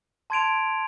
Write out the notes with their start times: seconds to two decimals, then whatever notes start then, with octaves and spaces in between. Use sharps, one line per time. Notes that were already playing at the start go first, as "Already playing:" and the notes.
0.30 A5 C6 G#6 D7 F7